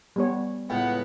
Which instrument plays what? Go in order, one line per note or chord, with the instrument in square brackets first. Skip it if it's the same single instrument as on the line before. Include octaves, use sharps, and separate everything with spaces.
[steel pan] G3 B3 C#5
[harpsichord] C#2 A2 [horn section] B3 [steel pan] G5